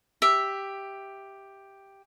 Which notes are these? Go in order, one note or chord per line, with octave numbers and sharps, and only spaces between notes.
G4 E5